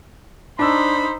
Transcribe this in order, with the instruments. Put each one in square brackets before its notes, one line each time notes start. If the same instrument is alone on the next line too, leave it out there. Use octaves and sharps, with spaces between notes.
[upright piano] D4 E6 [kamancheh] D#4 C5 [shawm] B5